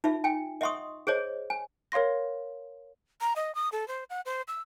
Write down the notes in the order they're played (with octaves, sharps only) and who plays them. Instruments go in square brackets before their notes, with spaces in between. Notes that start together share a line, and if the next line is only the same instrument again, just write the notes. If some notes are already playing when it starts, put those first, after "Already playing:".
[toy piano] D#4 F4 E5
G5 G#5
D#5 E5 F#5 C6 C#6 D#6
G#4 C5 C#5 D#5
G#5
[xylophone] A#4 C#5 F5 C6 A#6
[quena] A#5
D#5
D#6
A4
C5
F#5
C5
E6